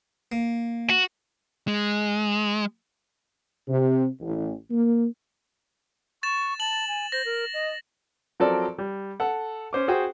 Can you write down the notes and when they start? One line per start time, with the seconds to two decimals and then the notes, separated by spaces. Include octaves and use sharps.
0.32 A#3
0.90 F#4
1.68 G#3
3.68 C3
4.21 A1
4.71 A#3
6.23 C#6 A6 E7
6.60 A5 F#7
6.88 G#5
7.12 C5 A#6
7.25 A#4
7.54 D#5
8.40 F3 F#3 C4 A4 A#4 D5
8.78 G3
9.20 A4 F#5
9.73 C#4 C5 D6
9.88 F#4 G#4 C5 G5